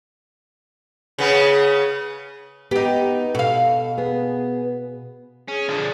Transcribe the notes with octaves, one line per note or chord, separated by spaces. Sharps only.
C#3 B3
B3 D#4 G4
B2 A4 F5
B3 G#4
C#4 G#4
D3 F3 D5 G#5 A5